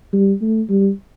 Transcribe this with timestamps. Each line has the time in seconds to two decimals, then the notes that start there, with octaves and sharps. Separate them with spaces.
0.13 G3
0.41 A3
0.69 G3